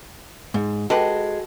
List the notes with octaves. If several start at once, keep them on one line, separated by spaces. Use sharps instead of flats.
G#2
G#3 F#4 G4 A4 B4